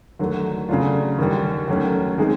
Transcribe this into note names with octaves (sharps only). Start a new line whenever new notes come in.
D#2 D3 F#3 A3
C#3 F#3 A3 D4 F4
D#2 D3 G3
D#2 D#3 F#3 A3 C#4
D#3 G#3 C4 D#4 G#4